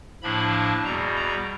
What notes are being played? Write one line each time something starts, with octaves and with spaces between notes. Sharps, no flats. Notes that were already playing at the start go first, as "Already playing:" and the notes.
A2 F3 A#3 D4 B5
E2 B2 G3 A#5
A#5